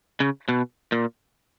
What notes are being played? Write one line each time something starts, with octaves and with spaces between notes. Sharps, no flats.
C#3
B2
A#2